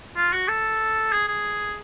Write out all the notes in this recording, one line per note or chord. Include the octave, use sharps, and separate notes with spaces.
F4
F#4
A4
G#4
G#4